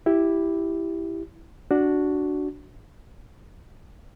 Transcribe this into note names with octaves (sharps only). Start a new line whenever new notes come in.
E4 G4
D4 F#4